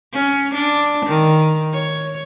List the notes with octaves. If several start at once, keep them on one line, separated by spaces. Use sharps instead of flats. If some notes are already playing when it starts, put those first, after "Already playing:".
C#4
D4
D#3
C#5